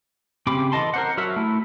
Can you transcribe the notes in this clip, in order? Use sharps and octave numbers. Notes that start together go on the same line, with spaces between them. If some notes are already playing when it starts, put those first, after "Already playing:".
C#3 C4 G4 B5 D6
E3 A4 D#5 A5 C6
A#4 C5 F#5
F#3 F#4 A#4 E5
A3 E4